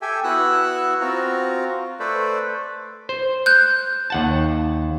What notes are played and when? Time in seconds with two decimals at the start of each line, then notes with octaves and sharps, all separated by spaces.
0.02 G4 A4 E5 G5 G#5
0.24 B3 E4 F#4 F#5 E6 F#6
1.01 C4 F4 F#4 A#5
2.00 A3 A4 B4 C5 D5
3.09 C5
3.46 F#6 G6
4.10 D#2 F#5 A5